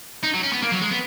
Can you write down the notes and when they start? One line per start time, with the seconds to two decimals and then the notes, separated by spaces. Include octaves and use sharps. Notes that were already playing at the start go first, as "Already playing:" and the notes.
0.23 D#4
0.34 F#3
0.43 C#4
0.52 B3
0.62 A#3
0.72 F#3
0.82 G#3
0.91 B3